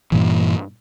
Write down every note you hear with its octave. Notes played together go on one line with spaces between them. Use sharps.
G2 A#2 E3